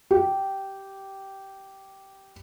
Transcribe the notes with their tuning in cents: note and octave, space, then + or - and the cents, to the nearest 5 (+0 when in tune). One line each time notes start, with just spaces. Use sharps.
G4 -10